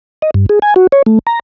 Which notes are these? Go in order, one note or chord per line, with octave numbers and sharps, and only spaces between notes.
D#5
G2
G#4
G#5
F#4
C#5
A3
A#5